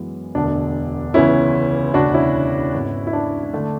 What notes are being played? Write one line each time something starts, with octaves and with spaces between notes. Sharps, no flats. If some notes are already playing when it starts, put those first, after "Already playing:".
Already playing: F#2 E3 G#3 B3
E1 D2 D3 D4
C#2 C#3 E3 B3 C#4 E4
E1 D2 C#3 D4 F#4
C#4 E4
G#1 G#2 G#3 B3
E4
D4
D3 A3